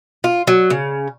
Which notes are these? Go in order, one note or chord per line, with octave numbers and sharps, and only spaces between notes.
F4
F#3
C#3